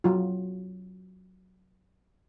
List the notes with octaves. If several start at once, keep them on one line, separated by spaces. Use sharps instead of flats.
F#3 F4